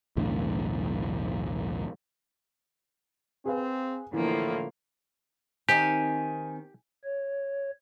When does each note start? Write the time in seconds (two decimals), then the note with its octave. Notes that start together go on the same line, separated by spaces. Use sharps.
0.17 B1 E2 A2 D3
3.45 C4 G#4 B4 F5
4.13 A2 D3 E3 F3 A#3
5.69 D#3 C4 D#4 G4 G#5
7.04 C#5